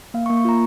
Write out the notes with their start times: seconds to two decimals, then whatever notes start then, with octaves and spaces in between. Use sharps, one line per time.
0.14 A#3 F5
0.26 C#6
0.30 A#3
0.37 C#6
0.45 F4 A#5